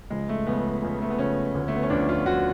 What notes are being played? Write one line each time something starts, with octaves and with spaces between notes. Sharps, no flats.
C#2 C#3 F3 G#3
A3
C#2 C#3 F3 B3
C#2 C#3 F3
A3
B3
C#2 C#3 F3 C#4
D2 D3 F3
A3
B3
C#4
D2 D3 F3 D4
F4
D2 D3 F3 F#4